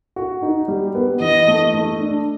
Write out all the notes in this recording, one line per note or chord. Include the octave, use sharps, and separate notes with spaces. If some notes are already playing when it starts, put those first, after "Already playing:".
F#4
D#4
G3
B3
E3 D#5
A3
A3
D4